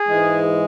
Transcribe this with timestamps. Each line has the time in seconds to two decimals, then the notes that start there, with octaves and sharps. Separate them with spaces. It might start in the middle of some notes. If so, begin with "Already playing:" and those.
Already playing: G#4
0.08 G#2 E3 G#3